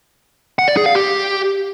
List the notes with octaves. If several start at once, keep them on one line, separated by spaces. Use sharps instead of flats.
F#5
D5
G#4
F5
G4